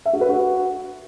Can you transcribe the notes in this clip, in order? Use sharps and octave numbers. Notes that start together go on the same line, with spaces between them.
E5
F#4
B4
F#4